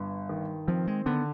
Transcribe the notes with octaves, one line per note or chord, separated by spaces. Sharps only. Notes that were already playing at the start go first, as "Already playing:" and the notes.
Already playing: G1 G2 G3
D#3
F3 C4
G#3
D3 B3